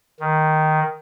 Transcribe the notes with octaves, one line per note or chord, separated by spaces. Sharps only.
D#3